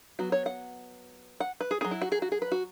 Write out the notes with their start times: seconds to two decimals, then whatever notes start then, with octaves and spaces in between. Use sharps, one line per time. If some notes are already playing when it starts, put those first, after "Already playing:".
0.19 F#3 B3 F#4
0.32 C#5
0.46 F#5
1.40 F#5
1.61 B4
1.71 G#4
1.81 C#4 G#4
1.85 F#3
1.91 E4
2.02 F#4
2.12 G#4
2.22 F#4
2.32 G#4
2.42 B4
2.52 F#4